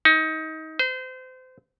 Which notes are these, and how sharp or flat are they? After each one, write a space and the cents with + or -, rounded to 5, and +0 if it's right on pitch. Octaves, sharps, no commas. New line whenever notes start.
D#4 +25
C5 -30